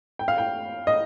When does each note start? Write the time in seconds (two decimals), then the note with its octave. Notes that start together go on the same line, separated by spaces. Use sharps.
0.19 G5
0.28 F5
0.38 G5
0.87 D#5